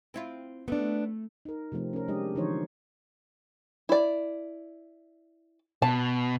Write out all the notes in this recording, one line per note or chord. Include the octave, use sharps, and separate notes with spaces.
C4 E4 F4
A3 B3 D4
D#4 A#4
C3 F3 A3 C4
C#4 A#4
G3 G#3 D4 G4 D#5
D3 E3 F3 D#4 C5 C#5
E4 D5
B2 A5